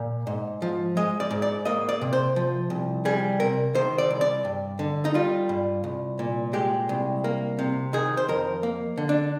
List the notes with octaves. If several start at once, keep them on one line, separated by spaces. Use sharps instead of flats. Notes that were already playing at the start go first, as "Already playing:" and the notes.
Already playing: A#2 A#3
G#2
F3
G#3 D#5
D5
G#2
D5
A#3 D#5
D5
C3
C5
F3
C2
G3 G#4
C3 A#4
D#3 C5
D5
C2
D5
G2
D3
D#4
G3 F4
G2
C2
A#2
G#3 G4
C2
A#3
C3
D#3 G#4
C5
F2 A#4
A#3
D3
D4